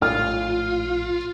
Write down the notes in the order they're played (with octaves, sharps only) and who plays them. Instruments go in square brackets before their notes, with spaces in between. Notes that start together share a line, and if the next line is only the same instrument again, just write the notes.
[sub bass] A#1 [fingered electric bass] A2 [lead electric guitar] F4 [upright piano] F6